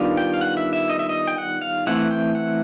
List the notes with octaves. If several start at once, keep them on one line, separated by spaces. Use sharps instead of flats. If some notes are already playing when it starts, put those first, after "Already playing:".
Already playing: D#3 G3 B3 D4 F4
G5
F5
F#5
E5
E5
D#5
E5
D#5
G5
F#5
F5
E3 A3 C4 E4 F#5
G5
F#5